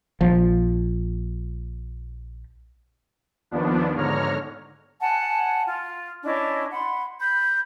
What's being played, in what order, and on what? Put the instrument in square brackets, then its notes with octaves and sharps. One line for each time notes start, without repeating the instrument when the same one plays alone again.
[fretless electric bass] A#1 F3
[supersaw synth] D#2 F3 B3 D4
G#2 D3 C#5 A#5 F6
[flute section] F#5 G#5 A5
F4
C#4 D4 E4 D#5
F#5 B5 C6
B5 G6